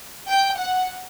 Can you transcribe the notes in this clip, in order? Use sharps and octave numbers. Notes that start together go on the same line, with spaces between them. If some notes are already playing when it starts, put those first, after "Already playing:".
G5
F#5